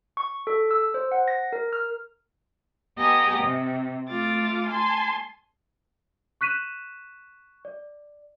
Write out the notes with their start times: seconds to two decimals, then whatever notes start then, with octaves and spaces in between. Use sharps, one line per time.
0.17 C#6
0.47 A4
0.71 E6
0.94 C5
1.12 F#5
1.28 A#6
1.53 A#4
1.73 F6
2.97 B3 G4 D#5 G#5 A#5
3.39 C3
4.11 A3 F4 D6 A6
4.68 G#5 A5 C6
6.41 C#6 F#6 B6 D#7 E7
7.65 D5